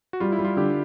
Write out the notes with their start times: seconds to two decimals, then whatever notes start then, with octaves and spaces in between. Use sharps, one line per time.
0.13 F#4
0.20 G3 F4
0.32 E4
0.39 G3
0.45 F4
0.57 D3 G4